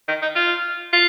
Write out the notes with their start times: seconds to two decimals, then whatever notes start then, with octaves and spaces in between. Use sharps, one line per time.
0.08 D#3
0.22 D#4
0.36 F4
0.93 F4